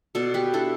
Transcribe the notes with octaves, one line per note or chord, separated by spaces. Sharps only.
B2 A4 D5
G4 B4
D4 E4 A4